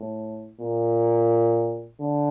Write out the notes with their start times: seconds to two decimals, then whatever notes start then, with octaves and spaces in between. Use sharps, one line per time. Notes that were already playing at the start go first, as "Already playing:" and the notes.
Already playing: A2
0.61 A#2
2.00 D3